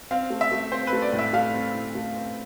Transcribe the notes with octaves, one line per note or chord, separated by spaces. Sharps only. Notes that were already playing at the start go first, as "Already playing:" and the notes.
C4 F5
A3
E5
A3
C4 C5
B4
A3
D5
A2
E5
A3 F5
C4
A2
A3
C4